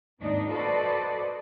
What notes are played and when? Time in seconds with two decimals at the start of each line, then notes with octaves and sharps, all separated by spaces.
0.20 D#2 G#2 C4 D4 D#4
0.51 F#4 A4 B4 C5 D5 D#5